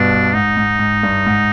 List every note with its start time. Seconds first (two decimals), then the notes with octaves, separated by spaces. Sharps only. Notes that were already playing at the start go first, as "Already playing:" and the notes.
Already playing: G2 B2 D4
0.34 G#2 D#4
0.57 G#2
0.79 G#2
1.03 G2
1.26 G#2